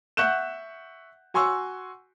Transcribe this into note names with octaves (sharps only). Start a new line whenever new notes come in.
E5 F#5 C#6 F#6 G6 E7
F#4 G#5 C6 C#6 E6